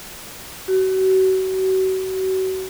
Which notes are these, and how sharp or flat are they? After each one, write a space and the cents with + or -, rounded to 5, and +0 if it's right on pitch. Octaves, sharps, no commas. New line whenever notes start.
F#4 +35